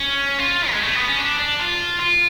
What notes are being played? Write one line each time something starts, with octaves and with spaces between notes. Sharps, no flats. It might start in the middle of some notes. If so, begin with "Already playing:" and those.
Already playing: C#4
F4
G#3
A3
B3
C#4
D4
D4
F4
F4